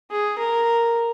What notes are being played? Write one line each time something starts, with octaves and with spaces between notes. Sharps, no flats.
G#4
A#4